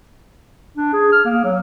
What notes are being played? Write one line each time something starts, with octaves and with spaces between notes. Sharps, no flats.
D4
G#4
F6
A#3
F#3